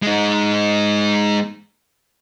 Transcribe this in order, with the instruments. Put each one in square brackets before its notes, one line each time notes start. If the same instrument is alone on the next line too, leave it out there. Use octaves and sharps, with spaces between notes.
[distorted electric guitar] G#3 D#4